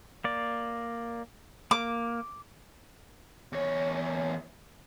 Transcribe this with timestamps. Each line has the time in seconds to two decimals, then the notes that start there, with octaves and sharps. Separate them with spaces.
0.24 A#3 D5
1.71 A#3 D6
3.53 E2 C#5